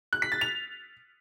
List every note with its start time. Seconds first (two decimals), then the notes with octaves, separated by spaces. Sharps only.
0.13 F#6
0.22 B6
0.32 A6
0.41 F7